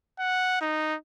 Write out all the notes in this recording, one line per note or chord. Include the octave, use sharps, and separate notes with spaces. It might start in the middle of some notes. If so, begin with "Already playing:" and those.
F#5
D#4